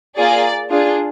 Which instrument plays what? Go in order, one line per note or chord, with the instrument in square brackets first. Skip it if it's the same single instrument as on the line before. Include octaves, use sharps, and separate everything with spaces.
[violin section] A#3 F4 G#4 D5
D4 F4 G#4